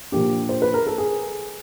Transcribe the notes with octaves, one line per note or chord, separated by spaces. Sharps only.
A#2 F3 A#3 D4 G4
C5
B4
A#4
A4
G#4